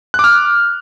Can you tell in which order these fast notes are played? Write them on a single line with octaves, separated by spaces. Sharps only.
F#6 D6 F6